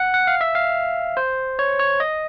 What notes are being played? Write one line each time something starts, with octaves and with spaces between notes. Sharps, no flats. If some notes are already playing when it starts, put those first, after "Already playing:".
Already playing: F#5
F#5
F5
E5
F5
C5
C#5
C#5
D#5